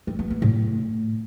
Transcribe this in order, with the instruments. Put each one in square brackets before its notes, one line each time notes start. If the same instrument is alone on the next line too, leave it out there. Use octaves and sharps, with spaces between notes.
[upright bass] C4
B3
B3
A2